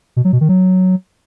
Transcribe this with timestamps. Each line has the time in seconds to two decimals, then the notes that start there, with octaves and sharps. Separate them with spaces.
0.16 B2
0.25 F#3
0.33 B2
0.41 D#3
0.49 F#3